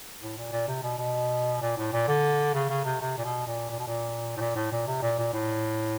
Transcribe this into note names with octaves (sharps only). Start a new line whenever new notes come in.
A2
A#2
A#2
C3
B2
B2
A#2
A2
A#2
D3
C#3
C#3
C3
C3
A#2
B2
A#2
A#2
B2
A#2
A2
A#2
A2
A#2
C3
A#2
A#2
A2